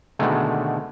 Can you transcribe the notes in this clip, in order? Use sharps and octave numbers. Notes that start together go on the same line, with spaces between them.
B2 D3 D#3 G#3 A3